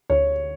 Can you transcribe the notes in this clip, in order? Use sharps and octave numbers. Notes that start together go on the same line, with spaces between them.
D2 C#5